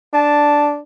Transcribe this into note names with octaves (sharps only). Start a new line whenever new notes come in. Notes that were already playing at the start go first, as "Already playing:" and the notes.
D4 A5